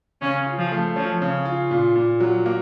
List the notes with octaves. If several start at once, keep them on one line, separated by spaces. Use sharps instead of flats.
C#3 C#4
F4
F3
A3
F3 C#4
C#3
F4
A#2
A#2
F#3
A#3